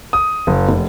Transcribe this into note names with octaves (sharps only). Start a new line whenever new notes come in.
D#6
F#1
F1